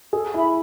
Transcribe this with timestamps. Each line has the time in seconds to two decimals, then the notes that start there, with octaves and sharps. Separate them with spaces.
0.13 G#4 A4
0.34 E4 E5 B5